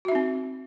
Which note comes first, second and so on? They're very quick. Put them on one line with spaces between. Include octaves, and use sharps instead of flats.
F#4 E5 D#4 C4